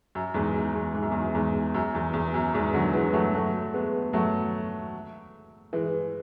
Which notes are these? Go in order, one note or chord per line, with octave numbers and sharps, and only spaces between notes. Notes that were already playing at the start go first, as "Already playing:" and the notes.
F#2
E2 G#2
F#2
E2
G#2
F#2
E2
F#2
E2 G#2
F#2
E2
E2
F#2
E2 G#2
D3 F#3
E3 G#3
F#3 A3
F#3 A3
G#3 B3
F#3 A3
E3 G#3